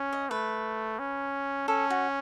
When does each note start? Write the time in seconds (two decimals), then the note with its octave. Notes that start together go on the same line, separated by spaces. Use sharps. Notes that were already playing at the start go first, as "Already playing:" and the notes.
Already playing: C#4
0.13 D#5
0.30 A3 B4
0.99 C#4
1.68 C#4 A4
1.90 F#4